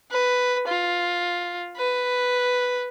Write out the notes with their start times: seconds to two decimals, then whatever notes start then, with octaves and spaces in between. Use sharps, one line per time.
0.11 B4
0.67 F4
1.76 B4